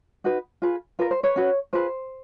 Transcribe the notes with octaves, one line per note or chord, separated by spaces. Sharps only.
D#4 F#4 B4
F4 G#4 B4
F4 A#4 B4
C5
B4 C#5
C#4 F#4 B4
F4 G#4 B4 C5